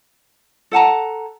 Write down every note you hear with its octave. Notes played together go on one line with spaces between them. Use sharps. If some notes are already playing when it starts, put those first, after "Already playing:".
A4 F#5 A5 A#5